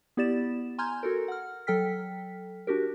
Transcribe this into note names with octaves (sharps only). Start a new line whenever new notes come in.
B3 E4 G4 D5 A6 E7
G#5 A#5 C6 F6 G6 G#6
F#4 A4 A#4
F#5 F6
F#3 A4 G5 F6 B6
D4 F#4 G4 A#4